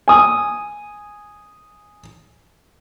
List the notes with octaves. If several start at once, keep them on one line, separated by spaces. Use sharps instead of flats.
G#5 D#6